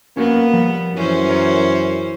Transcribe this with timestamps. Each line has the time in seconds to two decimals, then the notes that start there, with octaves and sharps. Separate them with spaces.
0.17 A#3 B3 C#4 F#4 A#4
0.53 F3 G3
0.94 F#2 E3 C#4 C5
1.29 A#4 C#5